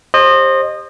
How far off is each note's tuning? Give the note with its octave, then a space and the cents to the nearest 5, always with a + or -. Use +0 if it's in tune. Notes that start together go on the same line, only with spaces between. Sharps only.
G4 +20 C5 +25 D#5 -25